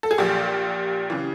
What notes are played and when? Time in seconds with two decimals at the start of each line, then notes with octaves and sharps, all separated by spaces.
0.03 A4
0.11 G#4
0.18 A#1 A#2 G4
1.10 C#3 E3